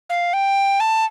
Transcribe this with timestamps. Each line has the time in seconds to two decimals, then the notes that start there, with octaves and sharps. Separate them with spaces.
0.10 F5
0.33 G5
0.80 A5